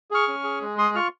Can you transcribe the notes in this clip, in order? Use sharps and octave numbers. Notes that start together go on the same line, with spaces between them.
G#4 C#6 F6
C#4
G#4
G#3
G#4 C6 D#6
F4 C#6 F6